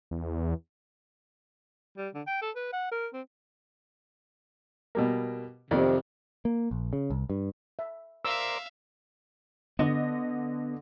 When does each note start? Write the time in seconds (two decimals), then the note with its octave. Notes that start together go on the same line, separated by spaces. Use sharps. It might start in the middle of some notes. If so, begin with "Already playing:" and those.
0.11 E2
1.98 G3
2.14 D3
2.27 G5
2.42 A4
2.56 B4
2.73 F#5
2.91 A#4
3.13 C4
4.95 B2 G3 A#3
5.71 F2 C3 D#3 D5
6.45 A#3
6.71 A#1
6.93 C#3
7.10 C2
7.30 G2
7.79 E5
8.25 A#4 C5 D5 E5 F5 E6
9.79 D3 B3 D#5